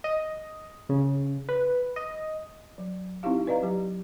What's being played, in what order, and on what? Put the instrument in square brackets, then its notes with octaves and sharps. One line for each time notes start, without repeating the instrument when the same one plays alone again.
[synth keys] D#5
C#3
B4
D#5
[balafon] F#3
C4 D#4 E4 G4 F5
B4 D5 D#5 F5 A#5
F#3 G4